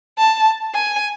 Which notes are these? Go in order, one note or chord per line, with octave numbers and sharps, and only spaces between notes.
A5
G#5